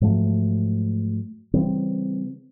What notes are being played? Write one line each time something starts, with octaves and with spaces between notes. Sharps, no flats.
G#2 F3 F#3 A3
C#3 E3 G3 C4